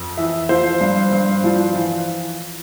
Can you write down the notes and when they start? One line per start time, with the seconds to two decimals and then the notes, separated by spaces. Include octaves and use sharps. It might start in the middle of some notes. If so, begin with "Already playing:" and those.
Already playing: F2
0.17 E3 E5
0.49 F3 C5
0.81 G2
1.12 G2
1.44 F3
1.76 E3